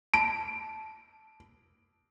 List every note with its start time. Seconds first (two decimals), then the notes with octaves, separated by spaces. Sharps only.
0.14 A5 D7